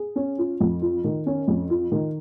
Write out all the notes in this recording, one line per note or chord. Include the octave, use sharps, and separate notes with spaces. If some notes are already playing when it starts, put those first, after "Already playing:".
Already playing: G#4
C#4
F4
F2
F4
D#3
C#4
F2
F4
D#3